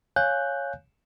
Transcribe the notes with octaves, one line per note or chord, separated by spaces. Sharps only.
C#5 F5 G#5 F#6 G6